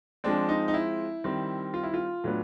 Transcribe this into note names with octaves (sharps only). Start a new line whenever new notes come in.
F3 G#3 C4 D4
D#4
D#4
E4
D#3 G3 C4
F4
E4
F4
A2 F#3 B3 D4